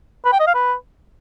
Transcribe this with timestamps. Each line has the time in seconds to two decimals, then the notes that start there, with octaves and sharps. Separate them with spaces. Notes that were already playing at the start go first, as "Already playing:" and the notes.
0.25 B4
0.32 G5
0.40 D#5
0.47 F5
0.55 B4